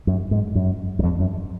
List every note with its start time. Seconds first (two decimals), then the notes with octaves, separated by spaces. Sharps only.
0.07 F#2
0.31 G#2
0.55 F#2
0.99 F#2
1.03 F2
1.20 F#2